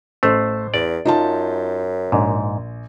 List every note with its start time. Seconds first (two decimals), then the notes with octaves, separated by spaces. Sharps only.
0.23 A1 A3 C5
0.74 E2 D5
1.05 F#2 D#4 F4 A5
2.12 A#1 G#2